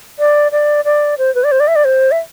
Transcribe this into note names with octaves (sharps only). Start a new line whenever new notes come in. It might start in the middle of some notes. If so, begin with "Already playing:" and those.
D5
D5
D5
C5
B4
D5
C5
D5
E5
D5
C5
E5